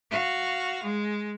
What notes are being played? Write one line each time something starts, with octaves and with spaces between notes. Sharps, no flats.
F#4 F5
G#3